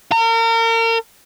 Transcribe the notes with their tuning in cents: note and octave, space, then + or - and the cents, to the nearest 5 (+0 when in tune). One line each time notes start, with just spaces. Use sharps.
A#4 -35